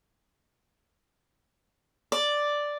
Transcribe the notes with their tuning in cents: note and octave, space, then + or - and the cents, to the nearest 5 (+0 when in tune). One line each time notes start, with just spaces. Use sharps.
D5 +0